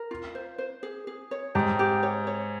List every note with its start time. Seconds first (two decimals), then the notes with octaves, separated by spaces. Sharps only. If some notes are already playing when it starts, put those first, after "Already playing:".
Already playing: A#4
0.11 F4
0.35 C5
0.58 C5
0.83 G#4
1.07 G#4
1.31 C#5
1.55 G#2 G4
1.79 G4
2.03 C#5
2.27 C#5